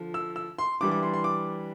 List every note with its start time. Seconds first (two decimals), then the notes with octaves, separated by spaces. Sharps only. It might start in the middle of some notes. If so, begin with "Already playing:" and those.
Already playing: D3 F3
0.14 E6
0.36 E6
0.59 C6
0.81 E3 G3 D4 D6
0.91 D6
1.03 C6
1.13 C6
1.24 D6